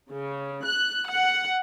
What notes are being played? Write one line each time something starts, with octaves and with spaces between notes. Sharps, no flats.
C#3
F#6
F#5